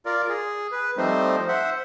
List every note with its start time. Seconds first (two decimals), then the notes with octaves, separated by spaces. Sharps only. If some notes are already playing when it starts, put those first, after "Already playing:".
0.06 F4 A#4 D5
0.29 G#4
0.72 B4
0.98 F3 G3 A3 C4 D#4 C5
1.48 C5 E5 F#5